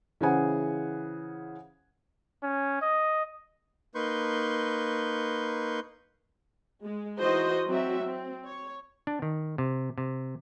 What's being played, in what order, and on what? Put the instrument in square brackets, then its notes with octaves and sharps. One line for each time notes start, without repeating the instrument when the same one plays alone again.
[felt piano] C#3 E3 G#4 C5 F#5 G#5
[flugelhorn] C#4
D#5
[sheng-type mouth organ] A#3 D#4 B4 C6 C#6 G6
[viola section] G#3
E3 D#4 F#4 C5 D#5 C6
F#3 C4 F#4 E5
C4
C#5
[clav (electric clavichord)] D4
D#3
C3
C3